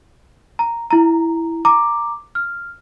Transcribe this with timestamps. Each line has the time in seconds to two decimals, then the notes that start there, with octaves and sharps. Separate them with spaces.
0.59 A#5
0.91 E4 A#5
1.65 A#5 D6
2.35 F6